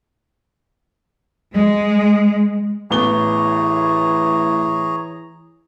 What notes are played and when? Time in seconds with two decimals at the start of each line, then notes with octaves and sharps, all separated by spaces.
1.54 G#3
2.91 A1 E3 B3 G#4 C#5 A#5 G7